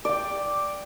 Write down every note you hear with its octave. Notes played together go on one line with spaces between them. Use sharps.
D5 G5